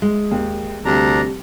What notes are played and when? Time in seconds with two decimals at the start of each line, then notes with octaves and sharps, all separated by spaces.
0.02 G#3
0.31 D#2
0.85 D2 C3 G3 D4 A#5